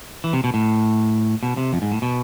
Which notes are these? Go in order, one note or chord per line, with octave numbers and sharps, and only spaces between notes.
E3
C3
B2
A2
B2
C3
F2
G#2
A2
B2